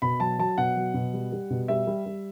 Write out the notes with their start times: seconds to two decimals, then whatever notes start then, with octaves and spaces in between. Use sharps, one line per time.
0.02 B2 B5
0.20 F#3 A5
0.39 F#3 A5
0.58 B2 F#5
0.76 F#3
0.94 B2
1.14 G3
1.32 G3
1.50 B2
1.68 G3 E5
1.87 G3
2.06 G3